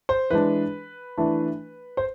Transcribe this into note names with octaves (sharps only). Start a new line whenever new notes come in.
C5
E3 G#3 D4 B4
E3 A3 D4
C5